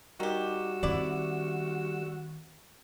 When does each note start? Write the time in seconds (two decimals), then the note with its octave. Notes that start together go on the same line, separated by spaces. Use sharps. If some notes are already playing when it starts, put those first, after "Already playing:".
0.20 D#3 G3 F#4 G4 E6
0.83 D#3 C4 E4 D5